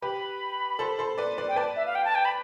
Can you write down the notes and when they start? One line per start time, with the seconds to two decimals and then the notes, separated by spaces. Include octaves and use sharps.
0.02 G4 B4 B5
0.79 A4 C5
0.99 A4 C5
1.18 B4 D5
1.38 B4 D5
1.48 G5
1.56 B4 D5 A5
1.76 E5
1.86 F5
1.95 G5
2.05 A5
2.15 G5
2.25 B5